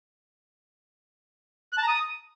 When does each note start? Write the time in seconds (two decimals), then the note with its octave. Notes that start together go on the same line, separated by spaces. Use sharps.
1.73 F#6
1.78 A5
1.83 A#5
1.88 D#6